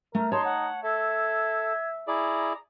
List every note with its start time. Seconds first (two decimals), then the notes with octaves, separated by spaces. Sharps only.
0.15 A3 A#4 F6
0.32 D#4 C#5 A5 C6
0.44 F#5
0.84 A4 E5 G#6
2.08 E4 G#4 D5 A#5